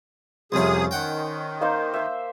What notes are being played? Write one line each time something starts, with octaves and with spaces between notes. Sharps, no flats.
C2 F2 C3 C#4 G#4 C5 B5 D#6
D#3 F#5 G5
A#3 D#4 C5
C5 E5